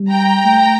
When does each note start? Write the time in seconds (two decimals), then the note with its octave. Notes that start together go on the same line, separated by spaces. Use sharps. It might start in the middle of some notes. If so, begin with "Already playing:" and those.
Already playing: G3
0.11 G5 A#5
0.45 A3